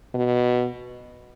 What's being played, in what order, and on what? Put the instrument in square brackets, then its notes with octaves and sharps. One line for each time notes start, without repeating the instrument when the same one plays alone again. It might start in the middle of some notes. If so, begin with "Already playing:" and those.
[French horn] B2